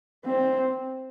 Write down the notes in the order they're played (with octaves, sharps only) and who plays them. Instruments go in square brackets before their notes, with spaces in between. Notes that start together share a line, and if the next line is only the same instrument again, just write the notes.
[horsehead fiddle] C4